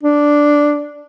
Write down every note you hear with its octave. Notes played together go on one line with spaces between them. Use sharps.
D4